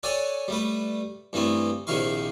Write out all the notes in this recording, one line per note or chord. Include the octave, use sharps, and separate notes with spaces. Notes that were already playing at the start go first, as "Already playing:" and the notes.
A4 C#5 D5 F#5 G#5
G3 A3 B4
G2 E3 A3 B3 C4
A#1 C3 D#3 E4 F5 C#6